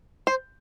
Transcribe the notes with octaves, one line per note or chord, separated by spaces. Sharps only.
C5